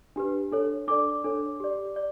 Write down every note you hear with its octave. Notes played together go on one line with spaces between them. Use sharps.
D4 G4 B4
D4 A4 C#5
D4 A4 D5 D6
D4 A4 C#5
G4 D5
D5